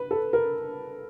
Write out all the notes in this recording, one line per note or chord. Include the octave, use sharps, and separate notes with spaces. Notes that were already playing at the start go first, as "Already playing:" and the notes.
Already playing: B4
A4
A#4